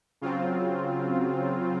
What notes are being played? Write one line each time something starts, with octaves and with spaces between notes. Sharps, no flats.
C#3 F#3 C4 F4